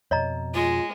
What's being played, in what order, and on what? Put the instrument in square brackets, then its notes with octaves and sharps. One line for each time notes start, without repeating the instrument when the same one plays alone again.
[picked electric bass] F2 B2 [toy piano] C#5 D#5 A#5
[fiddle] G#3 [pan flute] F4